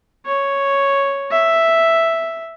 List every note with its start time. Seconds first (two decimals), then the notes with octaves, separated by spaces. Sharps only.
0.26 C#5
1.31 E5